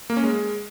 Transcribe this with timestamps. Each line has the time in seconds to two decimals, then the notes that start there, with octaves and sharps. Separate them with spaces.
0.10 A#3
0.17 C#4
0.24 G#3